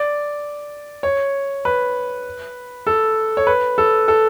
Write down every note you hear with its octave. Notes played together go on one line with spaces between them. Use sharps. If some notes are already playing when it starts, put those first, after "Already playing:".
Already playing: D5
C#5
B4
A4
C#5
B4
A4
A4